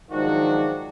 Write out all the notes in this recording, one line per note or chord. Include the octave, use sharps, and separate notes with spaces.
G#2 D#3 F3 F#3 D4 F#4